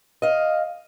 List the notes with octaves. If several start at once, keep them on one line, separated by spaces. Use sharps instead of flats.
D#5 F5